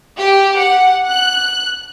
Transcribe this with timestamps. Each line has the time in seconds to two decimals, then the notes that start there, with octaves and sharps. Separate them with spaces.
0.18 G4
0.58 F#5
1.08 F#6